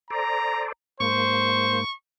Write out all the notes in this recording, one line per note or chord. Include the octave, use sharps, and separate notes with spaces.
A4 C5 D5 A#5
G#2 A#3 C5 C#6